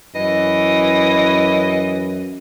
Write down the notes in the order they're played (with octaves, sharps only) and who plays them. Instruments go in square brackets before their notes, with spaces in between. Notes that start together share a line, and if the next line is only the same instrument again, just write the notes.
[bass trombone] F#2 [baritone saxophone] E3 [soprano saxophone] D#5